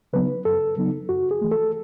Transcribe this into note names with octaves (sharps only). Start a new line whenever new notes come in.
C#3 F#3 B3 D#4 B4
F#2 A4
C#3 F#3 B3 D#4
F#2 F#4
G#4
E3 A3
A4